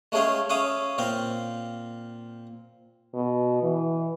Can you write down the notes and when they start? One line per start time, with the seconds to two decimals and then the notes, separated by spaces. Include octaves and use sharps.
0.12 G#3 A3 C#4 G#4 F5 G5
0.49 C#4 E5 F5 D6 D#6
0.98 A#2 C4 F5 G5
3.14 B2
3.63 E3